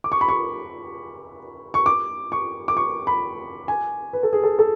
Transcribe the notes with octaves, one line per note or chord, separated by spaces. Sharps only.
D6
C#6
B5
C#6
C#6
D6
C#6
D6
C#6
B5
G#5
B4
A4
G#4
A4
A4